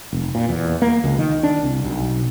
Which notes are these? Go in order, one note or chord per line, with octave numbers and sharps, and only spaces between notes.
F1
A#2
E2
A#3
C#2
D#3
D4
C2
B1